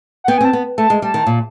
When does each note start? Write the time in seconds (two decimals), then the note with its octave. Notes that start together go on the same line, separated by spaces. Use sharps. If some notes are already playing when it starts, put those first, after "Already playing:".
0.24 F#5
0.28 B3 G5
0.38 G#5
0.41 C4
0.45 A5
0.53 B3
0.78 A3 A5
0.90 G#3
1.02 G3 A5
1.14 D#3
1.27 A#2